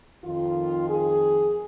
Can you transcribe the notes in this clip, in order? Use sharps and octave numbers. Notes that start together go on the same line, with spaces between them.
F2 D#3 F4
G#4